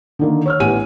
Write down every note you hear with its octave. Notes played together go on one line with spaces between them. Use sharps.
D3 D#3 A#3
C#5 E6 F6
A1 B3 G4 G#5 D#7